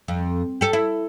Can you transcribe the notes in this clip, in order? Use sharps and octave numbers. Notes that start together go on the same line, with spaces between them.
F2
G4 A4
E4